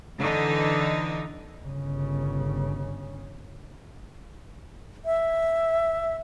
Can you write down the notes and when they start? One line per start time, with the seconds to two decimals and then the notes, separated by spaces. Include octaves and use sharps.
0.20 D3 E3 D#4
1.65 G1 C#3
5.05 E5